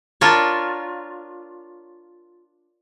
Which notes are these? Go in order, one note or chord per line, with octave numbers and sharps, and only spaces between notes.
D4 F4 A#4 C#5